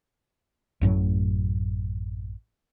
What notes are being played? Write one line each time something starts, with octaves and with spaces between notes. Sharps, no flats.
A1 F#2 A2 F#3